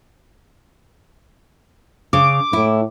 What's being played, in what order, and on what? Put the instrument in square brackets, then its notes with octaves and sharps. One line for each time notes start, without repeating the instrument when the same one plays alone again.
[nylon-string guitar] C#3 [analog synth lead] D6
[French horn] A2 [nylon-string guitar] E4